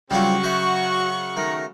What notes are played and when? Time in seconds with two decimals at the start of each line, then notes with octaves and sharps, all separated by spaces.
0.11 C#3 F#3 G3 C4 E4 F4 F#5 C#6
0.44 F#4 C5 E5
1.37 D#3 A3 A#4